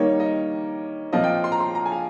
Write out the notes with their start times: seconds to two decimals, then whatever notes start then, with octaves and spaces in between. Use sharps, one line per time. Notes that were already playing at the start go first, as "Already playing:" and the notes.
Already playing: D#3 G3 A#3 D#4 C#5
0.20 D#5
1.13 A#2 F3 C4 F4 D#5
1.24 G5
1.34 G5
1.44 C6
1.52 A#5
1.60 C6
1.75 A#5
1.86 G#5
1.92 F5